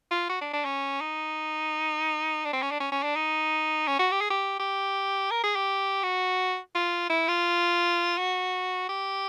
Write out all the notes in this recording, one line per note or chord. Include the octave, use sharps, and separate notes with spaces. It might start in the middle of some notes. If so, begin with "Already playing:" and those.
F4
F#4
D4
D4
C#4
D#4
D4
C4
C#4
D4
C#4
C#4
D4
D#4
C#4
F#4
G4
G#4
G4
G4
A#4
G#4
G4
F#4
F4
E4
F4
F#4
G4